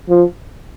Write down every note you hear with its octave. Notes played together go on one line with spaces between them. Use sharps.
F3